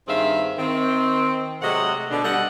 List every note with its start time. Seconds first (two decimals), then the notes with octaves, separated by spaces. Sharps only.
0.08 G2 D#3 C4 G#4 E5 F5
0.58 D#3 C4
1.62 C3 F#3 G#3 A3 D#5 F#5
2.11 B2 D3 D4
2.24 G3 F#4 A4 D#5 F#5